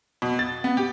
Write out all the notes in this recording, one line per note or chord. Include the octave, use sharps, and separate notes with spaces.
B2
A6
B3
G4